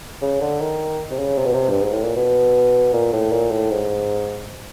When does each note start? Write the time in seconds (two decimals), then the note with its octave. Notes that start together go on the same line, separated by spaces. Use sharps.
0.22 C#3
0.41 D3
0.61 D#3
1.11 C3
1.19 C#3
1.38 C3
1.46 B2
1.53 C3
1.70 G2
1.81 G#2
1.93 A2
2.04 A#2
2.16 B2
2.93 A#2
3.13 A2
3.32 A#2
3.51 A2
3.70 G#2